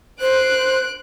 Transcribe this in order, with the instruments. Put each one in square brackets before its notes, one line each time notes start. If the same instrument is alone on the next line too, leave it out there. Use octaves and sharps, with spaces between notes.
[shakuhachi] C5 [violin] F#6 D7